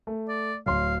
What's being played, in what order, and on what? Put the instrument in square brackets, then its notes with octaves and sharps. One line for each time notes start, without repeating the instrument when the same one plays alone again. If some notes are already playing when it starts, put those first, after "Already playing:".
[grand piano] A3
[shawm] D5
[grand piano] D1 C#5 C6 [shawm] F5